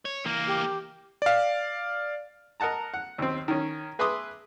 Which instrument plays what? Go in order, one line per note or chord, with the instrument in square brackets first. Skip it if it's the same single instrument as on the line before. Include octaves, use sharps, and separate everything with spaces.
[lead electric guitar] C#5
[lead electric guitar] E3 A#4 [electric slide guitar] A#3
[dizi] G4
[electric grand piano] D5 F5
[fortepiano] A#4 D#5 F#5 A5 A#5
F#5
D#2 C4
D#3 C#4
G#4 B4 E5 C6 D6 D#6